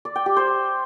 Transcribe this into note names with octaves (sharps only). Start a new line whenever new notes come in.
D5
G5
G4
C5